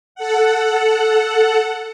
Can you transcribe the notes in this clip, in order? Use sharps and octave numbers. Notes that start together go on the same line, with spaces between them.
A4 F#5